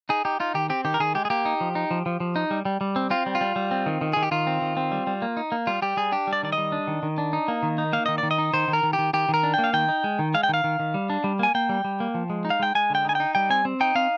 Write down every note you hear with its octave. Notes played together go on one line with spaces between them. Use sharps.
D#4 G#4
D#4 G4
D#4 F4
D#3 G4
C4 G4
D#3 G4
A#4
D#3 G#4
G#3 G4
G#4
A#3 G4
D#4
F3
D#4
F3
F3
F3
D#4
G3
G3
G3
C4
C4 F4
G3
F4
G3
G3
C4
D#3
D#3
D#3 G#4
G4
D#3 F4
C4
D#3
C4
G3
G3
A#3
D#4
A#3
G3 F4
G3 G4
G3 G#4
D4 G4
G3
D5
D#3 D5
D#5
G3
D4
D#3
D#3
D4
D#4
A#3
D#3
D#4
A#3 F5
D#3 D#5
D#3 D5
D#5
D#4
D#3 C5
D#3
A#4
D#3
G4
D#3
D#3 G4
D#3
A#4
D4
A#3 G5
F5
D#3 G5
D#4
G#3
D#3
G#3 F5
G5
D#3 F5
D#3
D#3
G3
D4
G3
A#3 G#5
A#3 G5
G3
G3
A#3
F3
G#3
D#4
F5
G#3 G5
G#3 G#5
D3 G5
D#4 G#5
D#4 G5
G3 G5
C4 G#5
C4
D#4 G5
C4 F5